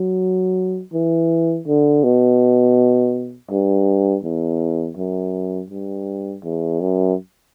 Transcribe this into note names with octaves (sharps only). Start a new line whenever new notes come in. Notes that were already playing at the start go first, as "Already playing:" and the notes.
Already playing: F#3
E3
D3
B2
G2
E2
F#2
G2
E2
F#2